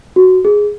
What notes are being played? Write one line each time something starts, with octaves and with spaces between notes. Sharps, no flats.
F#4
G#4